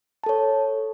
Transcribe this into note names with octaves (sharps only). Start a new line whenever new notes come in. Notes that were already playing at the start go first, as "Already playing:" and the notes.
A4 C#5 A5